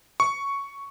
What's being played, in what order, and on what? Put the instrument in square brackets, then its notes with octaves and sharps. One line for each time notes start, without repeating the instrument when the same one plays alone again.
[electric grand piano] C#6